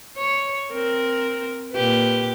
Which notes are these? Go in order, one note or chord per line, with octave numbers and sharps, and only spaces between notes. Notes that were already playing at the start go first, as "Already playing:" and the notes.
C#5
C4 A#4
A#2 G4 B4